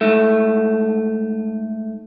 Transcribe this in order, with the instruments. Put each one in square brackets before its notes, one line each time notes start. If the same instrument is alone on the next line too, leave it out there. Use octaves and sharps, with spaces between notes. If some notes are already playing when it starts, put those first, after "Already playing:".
[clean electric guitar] G#2 A3